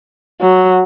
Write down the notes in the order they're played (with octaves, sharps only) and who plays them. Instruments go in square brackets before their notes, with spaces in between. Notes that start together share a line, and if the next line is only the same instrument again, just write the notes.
[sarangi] F#3